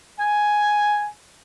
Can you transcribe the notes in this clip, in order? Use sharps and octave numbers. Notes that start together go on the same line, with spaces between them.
G#5